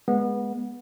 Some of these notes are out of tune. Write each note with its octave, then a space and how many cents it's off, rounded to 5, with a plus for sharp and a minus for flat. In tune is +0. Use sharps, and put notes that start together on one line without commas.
G#3 -5 B3 -20